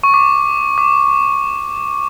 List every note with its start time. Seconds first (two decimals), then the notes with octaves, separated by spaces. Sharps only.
0.03 C#6
0.14 D6
0.78 D6